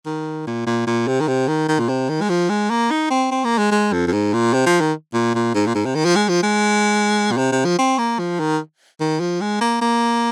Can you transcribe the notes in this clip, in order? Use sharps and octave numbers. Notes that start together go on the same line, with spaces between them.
D#3
A#2
A#2
A#2
C3
D#3
C3
D#3
D#3
A#2
C3
D#3
G#3
F3
G#3
A#3
D#4
C4
C4
A#3
G#3
G#3
F2
F2
G#2
A#2
C3
F3
D#3
A#2
A#2
G#2
A#2
G#2
C3
D#3
F3
G#3
F3
G#3
A#2
C3
C3
F3
C4
A#3
F3
D#3
D#3
F3
G#3
A#3
A#3